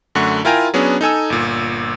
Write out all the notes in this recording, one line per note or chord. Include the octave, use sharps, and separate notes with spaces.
F#2 D3 A3 F#5 C#6
E4 F4 A#4 G5 G#5 A#5
F#3 B3 C#4 D4 G#4
D#4 A4 G#5 E6
G1 A#2